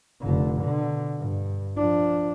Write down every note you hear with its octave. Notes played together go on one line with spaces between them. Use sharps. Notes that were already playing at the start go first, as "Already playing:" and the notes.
F1 D3
B2 D3
G2
F3 D4